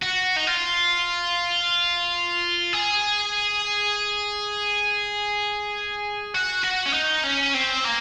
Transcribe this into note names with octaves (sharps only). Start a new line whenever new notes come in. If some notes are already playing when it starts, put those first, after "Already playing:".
F#4
D#4
F4
G#4
F#4
F#4
C#4
D#4
C#4
C4
A#3